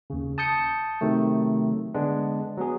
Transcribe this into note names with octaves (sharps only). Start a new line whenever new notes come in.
D#2 C#3
A5 D#6 G6 C#7
C3 D#3 F#3 A3
D3 G#3 B3 D4
F#3 B3 G#4